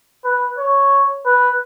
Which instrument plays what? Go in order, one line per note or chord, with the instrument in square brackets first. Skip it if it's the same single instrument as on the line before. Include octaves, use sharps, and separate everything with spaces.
[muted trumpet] B4
C#5
B4